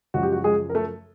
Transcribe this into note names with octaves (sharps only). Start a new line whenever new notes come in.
F#2 C#3 F3 G#3 F#4
G4
F#4
G#3 G#4
A#4
A3 A4